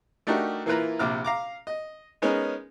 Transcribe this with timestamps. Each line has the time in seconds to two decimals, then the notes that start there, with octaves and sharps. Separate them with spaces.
0.27 A3 D4 D#4 F#4 G4 A#4
0.66 E3 A#3 E4 F4 B4 A#5
0.99 A#1 C3 D6 F6
1.24 F5 A#5 D6
1.67 D#5
2.22 G#3 B3 C#4 D#4 G#4 A#4